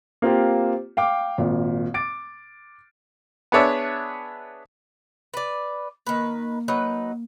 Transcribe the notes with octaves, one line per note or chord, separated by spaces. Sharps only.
A#3 C4 F4 G4
F5 G5 D6
G#1 A#2
D6 A6 D7
B3 D4 G#4 C#5 D5 E5
B4 D5
D#3 A#3 B4
F#3 D#4 B4